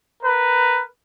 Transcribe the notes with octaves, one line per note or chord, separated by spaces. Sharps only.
A#4 B4